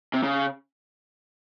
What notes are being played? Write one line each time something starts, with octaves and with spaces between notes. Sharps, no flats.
C3
C#3